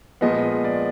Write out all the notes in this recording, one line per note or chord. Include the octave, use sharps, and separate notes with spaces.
A#2 F3 G#3 B3 D#5
D5